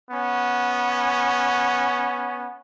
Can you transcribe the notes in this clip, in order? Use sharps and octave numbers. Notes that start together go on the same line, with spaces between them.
B3 C#4